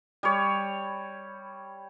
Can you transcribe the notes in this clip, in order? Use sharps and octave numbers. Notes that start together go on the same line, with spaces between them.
G3 C#5